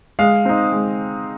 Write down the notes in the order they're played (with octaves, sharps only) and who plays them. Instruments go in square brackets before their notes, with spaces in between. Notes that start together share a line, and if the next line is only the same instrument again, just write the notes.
[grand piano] G#3 [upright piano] F5
[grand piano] C4 D#4
G#3